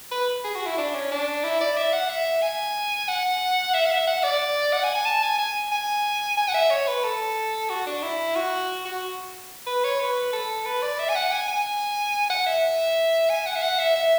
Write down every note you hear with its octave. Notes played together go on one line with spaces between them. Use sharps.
B4
G#4
F#4
E4
D4
C#4
D4
E4
D5
E5
F#5
E5
G#5
F#5
E5
F#5
E5
F#5
D5
F#5
G#5
G#5
A5
G#5
G#5
G#5
G#5
F#5
E5
C#5
B4
A4
F#4
D4
E4
F#4
F#4
B4
C#5
B4
A4
B4
D5
E5
G#5
F#5
G#5
G#5
F#5
E5
G#5
F#5
E5
F#5
E5
E5